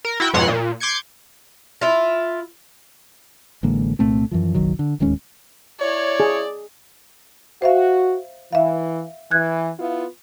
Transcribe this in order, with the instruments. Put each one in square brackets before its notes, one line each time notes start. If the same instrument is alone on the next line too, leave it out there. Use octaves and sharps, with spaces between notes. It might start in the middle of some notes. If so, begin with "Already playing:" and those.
[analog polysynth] A#4
E4 F#4 G5
F2 G#2 B2 C#5 F#5 C6
A#2
C6 D6 G6 G#6 C#7
[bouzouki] E4 F4
[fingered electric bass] A1 D3 G#3 A#3
C2 A#2 A3 C4
F#2 E3 F3
F#1 B1 D#3 F#3
D3
D1 D#2 G#3 C#4
[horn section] E4 C#5 [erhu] D5
[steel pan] G#4
[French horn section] F#4 [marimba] C5 E5 F5
[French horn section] E3 [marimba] E5 F5
[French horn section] E3 [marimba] F#6 G#6
[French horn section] B3 E4 F4